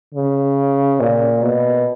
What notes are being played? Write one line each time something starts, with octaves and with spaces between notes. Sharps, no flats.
C#3
A#2
B2